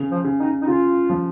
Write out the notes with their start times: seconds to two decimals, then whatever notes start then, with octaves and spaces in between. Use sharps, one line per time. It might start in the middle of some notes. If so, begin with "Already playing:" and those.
Already playing: C#3
0.11 F3
0.24 C#3
0.39 D#4
0.62 D#4
0.67 C#3 F4
1.10 F3